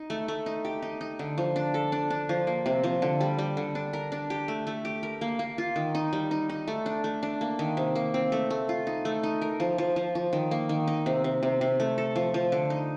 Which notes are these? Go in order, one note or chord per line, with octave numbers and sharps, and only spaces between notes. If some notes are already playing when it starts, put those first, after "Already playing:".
Already playing: D#4
A3
A3
D#4
G4
D#4
D#4
D3
F3
D4
A4
D4
D4
F3
A#3
C3
F3
D3
G3
G3
D3
D4
A#4
D4
G4
A3
A3
G4
A#4
A#3
A#3
F4
D#3
D#4
G3
D#4
D#4
A3
D4
A3
D4
A#3
D#3
C3
A#3
C4
A3
A3
F4
D#4
A3
D#4
A#4
F3
F3
F3
F3
D#3
A#3
D#3
D#4
C3
C3
C3
C3
A3
A4
F3
F3
D3
D#4